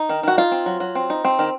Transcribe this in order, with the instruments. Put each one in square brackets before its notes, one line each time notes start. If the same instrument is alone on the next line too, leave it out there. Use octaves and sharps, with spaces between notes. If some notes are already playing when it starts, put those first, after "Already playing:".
Already playing: [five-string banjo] D#4
D#3
D#3 F#4
D#4 F4
C4
F#3
F#3
C4
D#4
C4
D#3